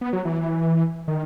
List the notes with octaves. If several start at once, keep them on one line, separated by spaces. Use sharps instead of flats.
B3
F#3
E3
D#3